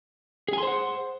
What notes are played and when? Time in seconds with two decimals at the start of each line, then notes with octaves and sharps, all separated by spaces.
0.48 G#4
0.53 G#5
0.58 C6
0.63 C5
0.67 F#5